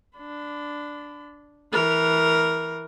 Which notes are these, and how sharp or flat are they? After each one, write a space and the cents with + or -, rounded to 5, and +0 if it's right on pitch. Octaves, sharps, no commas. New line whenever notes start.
D4 +0 B5 +35
E3 -15 A#4 +0